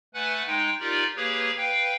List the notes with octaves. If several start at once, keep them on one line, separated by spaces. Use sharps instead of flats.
A3 B4 F#5 G#5 F#6
G#3 D#4 G5
D#4 F4 G4 A#4 D5
A#3 G4 G#4 B4 C#5
B4 F5 G5